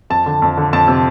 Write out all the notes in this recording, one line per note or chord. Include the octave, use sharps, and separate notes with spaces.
F2 A5
D3
F2
D3
F2 A5
C3